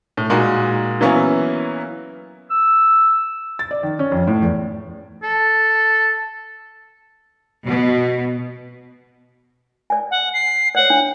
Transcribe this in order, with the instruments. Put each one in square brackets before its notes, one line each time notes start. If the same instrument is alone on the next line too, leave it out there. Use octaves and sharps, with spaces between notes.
[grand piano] A2
A#2 G#3 D#4 F#4
E3 F#3 A#3 B3 C#4 E4
[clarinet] E6
[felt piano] A6
D5
D#3
C#4
F2
A2
E2
[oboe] A4
[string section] B2
[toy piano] D5 G#5
[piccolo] F#5
C7
[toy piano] C#5 D5 [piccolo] F#5
[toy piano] D4